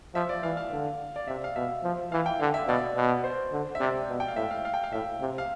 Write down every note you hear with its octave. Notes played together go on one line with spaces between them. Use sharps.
F3 E5
D5
E3 F5
F5
D3
D5
C3 E5
F5
B2 E5
F3
E3 F5
G5
D3 F5
E5
B2 D5
B2
C5
D3
E5
C3 D5
B2
G5
F5
A2 E5
F5
F5
G5
F5
A2 E5
C3
F5